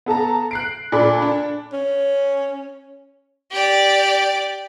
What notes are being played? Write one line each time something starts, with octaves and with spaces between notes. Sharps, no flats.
B3 A4 A5 A#5
F#6 C7 D7
A#2 D4 A4 D5 B5
D4
C#4
G4 D5